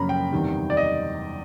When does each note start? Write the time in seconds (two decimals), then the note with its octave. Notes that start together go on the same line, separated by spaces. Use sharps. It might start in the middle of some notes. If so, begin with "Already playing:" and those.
Already playing: F#2 C#3 F3 A#3 C#4 A#5 B5
0.09 G5
0.32 E2 C3 D#3 G3
0.70 D5
0.77 D#5